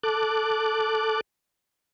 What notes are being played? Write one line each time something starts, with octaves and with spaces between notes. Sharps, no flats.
A4 D6 F#6